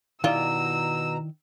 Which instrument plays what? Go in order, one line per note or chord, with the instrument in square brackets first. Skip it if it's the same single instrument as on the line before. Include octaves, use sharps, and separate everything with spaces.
[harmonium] B2 A#5 [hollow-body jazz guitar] D#3 E4 D5 [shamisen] G3 F4 [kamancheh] E6